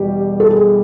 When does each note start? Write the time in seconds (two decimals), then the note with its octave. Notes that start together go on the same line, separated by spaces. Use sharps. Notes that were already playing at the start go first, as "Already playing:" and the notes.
Already playing: E2 B2 G3 G4
0.40 A4
0.51 G#4